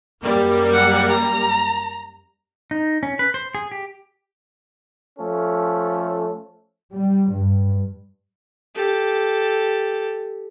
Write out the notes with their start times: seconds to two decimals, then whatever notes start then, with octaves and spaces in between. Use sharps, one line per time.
0.23 F#2 G3 A#3
0.73 F#5
1.09 A#5
2.71 D#4
3.03 C#4
3.19 B4
3.34 C5
3.55 G#4
3.72 G4
5.19 F3 A3 C#4 A4
6.92 G3
7.32 G2
8.75 G4 A4